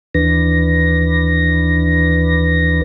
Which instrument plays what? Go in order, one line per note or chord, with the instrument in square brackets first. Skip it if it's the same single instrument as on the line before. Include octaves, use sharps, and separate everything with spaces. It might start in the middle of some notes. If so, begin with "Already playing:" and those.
[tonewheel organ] D#2 E3 D4 B4 A#6